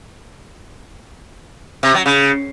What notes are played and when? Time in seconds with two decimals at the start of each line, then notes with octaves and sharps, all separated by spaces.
1.83 C3
1.94 F#3
2.06 C#3